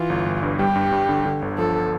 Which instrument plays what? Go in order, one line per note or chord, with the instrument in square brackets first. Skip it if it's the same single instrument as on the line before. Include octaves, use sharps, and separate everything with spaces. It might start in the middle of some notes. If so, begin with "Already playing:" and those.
Already playing: [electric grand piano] E3 [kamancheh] F4
[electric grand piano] G1
G1
G2
[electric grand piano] G3 [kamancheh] G4
[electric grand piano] G2
G2
D3
D3
G1
[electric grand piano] F3 [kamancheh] A4